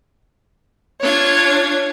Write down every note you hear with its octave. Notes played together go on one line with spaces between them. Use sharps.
D4 F4 C#5 G#6